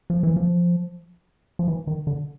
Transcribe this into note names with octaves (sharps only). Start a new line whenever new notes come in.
F3
E3
F3
F3
E3
D#3
D3